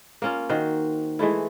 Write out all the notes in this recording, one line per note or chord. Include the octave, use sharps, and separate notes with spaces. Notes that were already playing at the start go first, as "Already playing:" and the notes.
A#3 C#4 F4
D#3 F#4 C5
E3 G#3 A3 E4